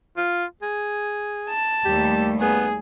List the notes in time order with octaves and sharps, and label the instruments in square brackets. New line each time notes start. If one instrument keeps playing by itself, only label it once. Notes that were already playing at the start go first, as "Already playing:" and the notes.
[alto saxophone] F4
G#4
[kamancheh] A5
[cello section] D#2 G3 A3 [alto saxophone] G4
[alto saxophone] B3 [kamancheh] G#4